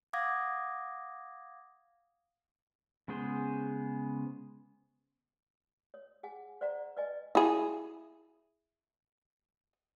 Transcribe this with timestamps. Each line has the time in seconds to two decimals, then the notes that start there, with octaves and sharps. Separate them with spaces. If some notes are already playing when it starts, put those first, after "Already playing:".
0.13 F5 F#5 D6 D#6 G#6 A#6
3.08 C#3 G#3 B3 G#4 C5
5.94 C#5
6.23 G#4 F#5 G#5
6.61 C5 D5 F#5 A#5
6.97 B4 D5 D#5 G#5
7.35 E4 G#4